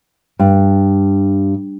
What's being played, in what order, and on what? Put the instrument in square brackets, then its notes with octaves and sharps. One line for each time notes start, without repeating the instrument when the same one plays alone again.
[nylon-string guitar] G2